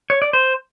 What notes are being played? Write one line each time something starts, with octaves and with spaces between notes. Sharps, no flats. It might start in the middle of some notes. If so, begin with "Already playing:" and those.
C#5
D5
C5